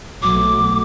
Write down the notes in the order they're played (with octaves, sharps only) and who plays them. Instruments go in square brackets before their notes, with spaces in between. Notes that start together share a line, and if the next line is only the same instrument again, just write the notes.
[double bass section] B1 F#3 A3 [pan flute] D6